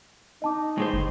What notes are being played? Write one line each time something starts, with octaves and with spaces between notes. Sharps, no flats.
D#4 D#5 A5 D6
A2 G#3 C5
G1